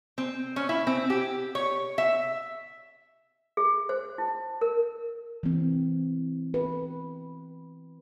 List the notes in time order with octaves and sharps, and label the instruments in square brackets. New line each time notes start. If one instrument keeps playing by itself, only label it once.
[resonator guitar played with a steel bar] C4
C#4
E4
C4
G4
C#5
E5
[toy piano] G#4
C5
E4
A#4
[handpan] E3 C4
B4